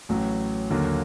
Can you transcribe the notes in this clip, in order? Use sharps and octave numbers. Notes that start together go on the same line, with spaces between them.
A1 A2 F#3
D#2 D3 F#3 A#3